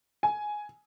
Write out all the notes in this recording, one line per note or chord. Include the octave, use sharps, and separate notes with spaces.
G#5